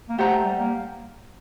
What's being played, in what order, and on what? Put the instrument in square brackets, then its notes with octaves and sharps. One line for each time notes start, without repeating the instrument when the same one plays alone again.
[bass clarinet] A#3
[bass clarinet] A3 [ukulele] G4 C5 F#5 A#5
[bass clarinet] G3
A#3